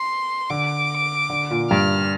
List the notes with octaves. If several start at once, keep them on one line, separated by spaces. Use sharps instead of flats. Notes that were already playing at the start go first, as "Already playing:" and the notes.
Already playing: C6
D3 D6
D3
A#2
G2 F6